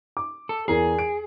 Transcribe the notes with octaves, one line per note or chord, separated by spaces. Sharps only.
D6
A4
E2 G#4 A#4 G#5
D7